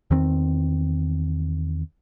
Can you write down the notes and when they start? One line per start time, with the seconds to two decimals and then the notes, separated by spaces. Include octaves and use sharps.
0.11 E2 D#3 C4